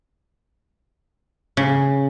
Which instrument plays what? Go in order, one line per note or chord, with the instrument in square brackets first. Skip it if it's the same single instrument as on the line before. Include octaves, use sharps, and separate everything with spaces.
[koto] C#3